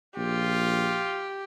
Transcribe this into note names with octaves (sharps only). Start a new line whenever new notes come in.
A#1 F4 G4